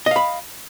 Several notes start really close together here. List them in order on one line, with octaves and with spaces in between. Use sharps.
D#5 F5 B5